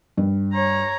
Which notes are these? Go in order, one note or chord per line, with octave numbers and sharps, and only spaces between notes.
G2
C#5 A#5